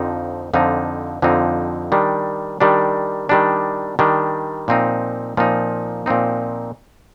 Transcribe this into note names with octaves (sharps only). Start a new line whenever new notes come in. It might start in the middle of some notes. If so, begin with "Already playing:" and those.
Already playing: F2 D3 F3 C4 D#4
F2 D3 F3 C4 D#4
F2 D3 F3 C4 D#4
D#3 G3 D4
D#3 G3 D4
D#3 G3 D4
D#3 G3 D4
A#2 F3 C4 D#4
A#2 F3 C4 D#4
A#2 F3 C4 D#4